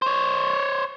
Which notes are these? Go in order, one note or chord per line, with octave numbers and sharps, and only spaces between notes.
C5 C#5